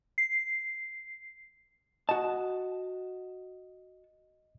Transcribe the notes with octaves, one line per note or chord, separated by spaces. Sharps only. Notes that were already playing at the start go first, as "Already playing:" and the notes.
C7
F#4 D#5 A5